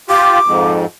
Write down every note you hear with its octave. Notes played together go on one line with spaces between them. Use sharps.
F4 G4 D6
F2 G#2